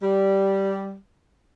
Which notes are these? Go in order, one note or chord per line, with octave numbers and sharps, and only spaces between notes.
G3